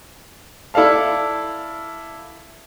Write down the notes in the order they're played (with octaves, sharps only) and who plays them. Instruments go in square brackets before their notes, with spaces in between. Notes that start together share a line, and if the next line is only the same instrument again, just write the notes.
[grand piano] E4 A4 D5 F5 A5